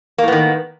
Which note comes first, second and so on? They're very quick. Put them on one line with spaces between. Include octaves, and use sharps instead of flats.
A#3 A2 B3 D#3